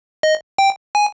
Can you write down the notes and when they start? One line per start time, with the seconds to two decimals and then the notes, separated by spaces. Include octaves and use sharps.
0.23 D#5
0.58 G5
0.95 G#5